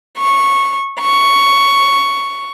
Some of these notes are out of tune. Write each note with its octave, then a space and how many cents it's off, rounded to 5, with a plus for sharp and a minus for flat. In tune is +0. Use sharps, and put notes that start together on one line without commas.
C#6 -15
C#6 +5